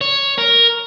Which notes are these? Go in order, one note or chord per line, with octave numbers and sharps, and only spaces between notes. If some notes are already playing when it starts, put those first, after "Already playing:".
C#5
A#4